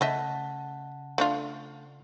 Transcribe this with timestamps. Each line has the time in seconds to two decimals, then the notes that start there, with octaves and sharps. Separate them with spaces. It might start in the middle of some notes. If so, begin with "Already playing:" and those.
0.01 C#3 A3 D#5 E5 F#5 A5
1.18 A3 D4 F4